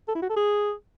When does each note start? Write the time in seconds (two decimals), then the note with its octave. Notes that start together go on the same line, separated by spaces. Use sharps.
0.08 A4
0.15 E4
0.22 F#4
0.29 A4
0.36 G#4